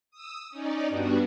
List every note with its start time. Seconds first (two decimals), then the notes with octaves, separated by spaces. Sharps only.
0.11 D#6 E6
0.50 C#4 D#4 D5
0.89 G2 G3 B3 D4 F#4